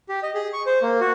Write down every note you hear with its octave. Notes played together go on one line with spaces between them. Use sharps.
G4
D#5
G#4
C#6
C5
A#3
F#4